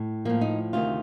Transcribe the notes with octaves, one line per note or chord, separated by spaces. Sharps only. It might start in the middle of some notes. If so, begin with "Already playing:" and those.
Already playing: A2
A2 F3 A#3
D#4
D2 C3 D#3 F4